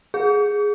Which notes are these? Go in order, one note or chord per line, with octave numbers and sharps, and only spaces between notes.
G#4